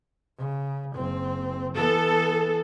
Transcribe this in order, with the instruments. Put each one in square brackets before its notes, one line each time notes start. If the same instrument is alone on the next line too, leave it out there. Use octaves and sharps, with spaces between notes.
[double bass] C#3
F#1 C4
[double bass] E3 B3 [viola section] A4